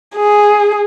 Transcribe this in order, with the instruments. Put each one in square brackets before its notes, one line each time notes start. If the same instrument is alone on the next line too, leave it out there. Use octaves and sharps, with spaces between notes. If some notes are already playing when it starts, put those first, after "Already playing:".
[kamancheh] G#4